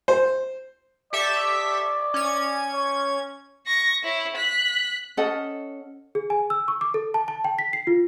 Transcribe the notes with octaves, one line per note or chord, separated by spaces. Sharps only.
C5
G4 A4 D5 E5
C#4 G#6
C#5
C#6 A#6
E4 C#5
F#6 B6
C#4 A4 D#5 F#5
G#4
G#5
E6
C#6
D6
A4
A5
A5
G5
B6
C7
F4